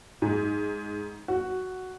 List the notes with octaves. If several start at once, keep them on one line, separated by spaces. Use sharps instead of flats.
G#2
F#4